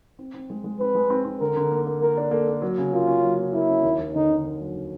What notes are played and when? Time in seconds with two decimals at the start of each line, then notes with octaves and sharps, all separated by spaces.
0.19 C4
0.34 C4
0.50 G#3
0.64 G#3
0.80 C4 B4
0.95 G#3
1.10 C4
1.25 C4
1.41 D3 A#4
1.56 D3
1.72 A#3
1.87 A#3
2.01 A#3 A#4
2.17 D4
2.31 A#3 A4
2.48 A#3
2.62 F#3
2.78 C#3
2.93 A#3 F4
3.07 C#4
3.23 F#3
3.38 A#3
3.53 A#3 E4
3.69 C#4
3.83 D#2
3.99 D#2
4.15 D3 D#4
4.30 D3
4.45 D#2
4.59 F#3
4.75 D3